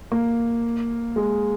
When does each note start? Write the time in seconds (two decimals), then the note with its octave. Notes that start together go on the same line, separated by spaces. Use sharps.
0.12 A#3
1.16 G#3